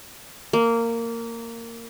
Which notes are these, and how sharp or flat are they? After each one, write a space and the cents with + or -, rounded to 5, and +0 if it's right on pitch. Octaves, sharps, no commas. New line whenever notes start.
A#3 -15